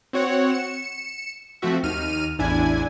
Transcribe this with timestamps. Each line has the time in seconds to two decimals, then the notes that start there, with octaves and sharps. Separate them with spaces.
0.13 C4 F#4 C#5 F#5
0.52 C#7 E7
1.62 F3 A3 C4 F#4 E5
1.83 D#2 D#4 F6 D#7
2.39 A1 E2 D4 E4 G#5 G#6